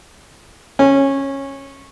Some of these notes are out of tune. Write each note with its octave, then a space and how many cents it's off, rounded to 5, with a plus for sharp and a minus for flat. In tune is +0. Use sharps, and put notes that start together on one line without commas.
C#4 -15